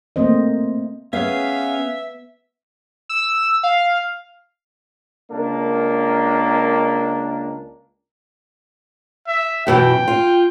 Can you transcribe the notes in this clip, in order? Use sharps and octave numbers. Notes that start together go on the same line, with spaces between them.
A3 A#3 C4 C5 D#5
B3 C#4 G#4 E5 F5
E6
F5
C#2 A#3 D4 A#4
E5
F#2 B2 E3 G5
F4